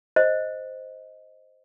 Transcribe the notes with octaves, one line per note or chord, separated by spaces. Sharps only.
C5 D#5